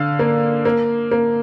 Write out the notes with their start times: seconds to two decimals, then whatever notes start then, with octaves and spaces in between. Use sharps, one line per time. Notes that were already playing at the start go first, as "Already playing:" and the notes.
Already playing: D3 F5
0.19 A#3
0.65 A#3
1.11 A#3